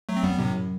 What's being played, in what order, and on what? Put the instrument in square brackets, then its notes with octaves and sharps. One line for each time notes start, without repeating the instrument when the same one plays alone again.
[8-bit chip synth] F#3 A3
C4
[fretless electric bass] F#2 [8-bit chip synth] G3 B3
[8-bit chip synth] A2 C3